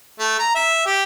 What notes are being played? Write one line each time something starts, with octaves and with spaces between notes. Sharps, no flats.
A3
A#5
E5
G4